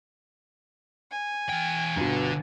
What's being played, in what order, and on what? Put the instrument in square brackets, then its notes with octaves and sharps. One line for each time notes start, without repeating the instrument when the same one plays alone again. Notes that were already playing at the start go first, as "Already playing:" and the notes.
[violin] G#5
[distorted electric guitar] E2 G5
[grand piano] G1 B2 [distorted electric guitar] D3